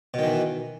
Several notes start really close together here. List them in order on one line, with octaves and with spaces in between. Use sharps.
B2 D#3 E3